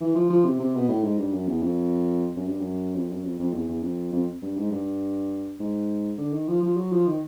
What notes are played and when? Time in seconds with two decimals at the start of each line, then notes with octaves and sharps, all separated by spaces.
0.01 E3
0.15 F3
0.30 F3
0.45 C3
0.59 C3
0.75 B2
0.89 A2
1.04 G#2
1.18 G2
1.33 F#2
1.48 E2
1.63 F2
2.36 F#2
2.48 G2
2.60 F#2
2.95 F2
3.10 F#2
3.24 F2
3.39 F2
3.53 E2
3.69 E2
3.83 F2
4.12 F2
4.42 G2
4.57 G#2
4.71 G2
5.59 G#2
6.18 D3
6.33 D#3
6.48 F3
6.63 F3
6.77 F#3
6.92 F3
7.07 D#3